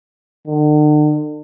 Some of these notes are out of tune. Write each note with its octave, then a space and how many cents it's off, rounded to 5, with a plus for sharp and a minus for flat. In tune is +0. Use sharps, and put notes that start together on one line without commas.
D3 +45